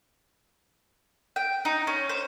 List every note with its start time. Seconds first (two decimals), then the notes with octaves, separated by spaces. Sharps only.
1.36 G5
1.65 D#4
1.87 C#4
2.09 C5